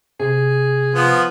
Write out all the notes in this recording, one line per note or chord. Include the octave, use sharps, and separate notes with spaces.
C3 G#4
F3 B3